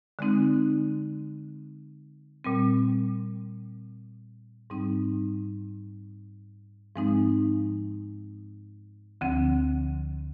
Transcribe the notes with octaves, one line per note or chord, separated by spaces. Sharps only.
D3 G#3 C4 D#4
A#2 G3 C4
G#2 G3 C4 D#4
G#2 F3 G#3 C4 D#4
D2 D3 F3 C4